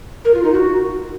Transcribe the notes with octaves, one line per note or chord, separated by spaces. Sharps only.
A#4
F4
D#4
F#4